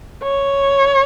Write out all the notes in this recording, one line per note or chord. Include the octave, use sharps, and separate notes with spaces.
C#5